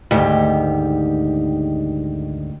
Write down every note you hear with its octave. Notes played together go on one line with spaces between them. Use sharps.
D2 G#2 D#3 G4